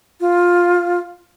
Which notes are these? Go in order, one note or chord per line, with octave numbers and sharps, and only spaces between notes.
F4